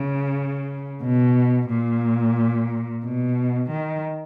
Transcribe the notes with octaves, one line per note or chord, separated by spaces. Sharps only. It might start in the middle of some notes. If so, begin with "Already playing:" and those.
Already playing: C#3
B2
A#2
B2
D#3